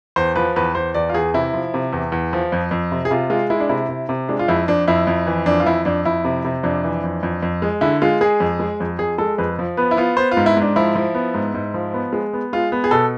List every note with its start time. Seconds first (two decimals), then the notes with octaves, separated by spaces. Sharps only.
0.16 E2 C5
0.36 F3 B4
0.56 E2 B4
0.75 E2 C5
0.94 E2 D5
1.09 F4
1.14 E2 G#4
1.34 C3 E4
1.54 F3
1.74 C3
1.93 E2
2.12 E2
2.33 F3
2.52 F2
2.71 F2
2.92 C3
3.05 G#4
3.11 C3 F4
3.30 G#3 F4
3.50 G#3 E4
3.60 D4
3.69 C3 E4
3.89 C3
4.09 C3
4.29 G#3 D4
4.39 F4
4.48 F2 E4
4.68 F2 D4
4.88 F2 E4
5.07 F2
5.27 E3
5.46 F2 D4
5.60 F4
5.66 F2 E4
5.85 F2 D4
6.05 F2 E4
6.25 C3
6.45 C3
6.63 F2 D4
6.84 E3
7.04 F2
7.23 F2
7.42 F2
7.62 G#3
7.81 D3 E4
8.02 G#3 F4
8.21 G#3 G#4
8.40 F2
8.60 G#3
8.80 F2
8.99 F2 G#4
9.18 G#3 A4
9.38 F2 B4
9.59 F3
9.77 B3 B4
9.91 E4
9.97 B3 F4
10.17 B3 C5
10.31 F4
10.37 G#2
10.46 E4
10.57 G#2 D4
10.76 F3 E4
10.95 F3
11.15 B3
11.34 G#2
11.54 G#2
11.74 F3
11.94 B3
12.13 G#3
12.33 B3
12.53 G#3 F4
12.72 B3
12.84 G#4
12.91 B2 A4